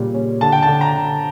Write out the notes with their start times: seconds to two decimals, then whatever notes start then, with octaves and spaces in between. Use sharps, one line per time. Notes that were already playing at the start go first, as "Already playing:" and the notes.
Already playing: A#2 C#3 G3
0.14 C#4
0.41 D3 A5
0.52 G5
0.62 D3 A5
0.81 A#5
0.94 D3